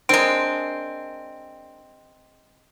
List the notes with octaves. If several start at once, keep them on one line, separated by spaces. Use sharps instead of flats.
G#3 C4 D4 A#4 D7